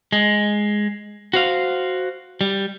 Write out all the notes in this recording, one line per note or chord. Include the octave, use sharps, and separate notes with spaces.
G#3
F#4 C5 F5
G3